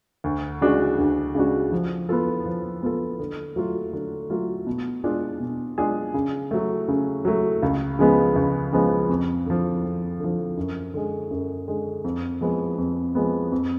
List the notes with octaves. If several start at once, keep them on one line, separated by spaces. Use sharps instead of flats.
D2
C#3 G#3 D4 F#4
D2
C#3 G#3 D4 F#4
F3
B3 F4 A4
F3
B3 F4 A4
D3
F#3 A3 F4
D3
F#3 A3 F4
B2
G#3 D4 F4 G#4
B2
G#3 D4 F4 G#4
C#3
F#3 A3
C#3
F#3 A3
C#2
C#3 F3 G#3 B3
C#2
C#3 F3 G#3 B3
F2
D3 F3
F2
D3 F3
F#2
D3 G#3
F#2
D3 G#3
F2
F3 G#3 B3
F2
F3 G#3 B3
F2